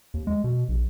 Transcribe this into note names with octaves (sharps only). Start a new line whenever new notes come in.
D#2
G#3
B2
A#1